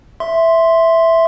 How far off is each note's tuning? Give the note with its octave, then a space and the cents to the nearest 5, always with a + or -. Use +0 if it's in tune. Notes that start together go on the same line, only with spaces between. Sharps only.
E5 +0 C6 +0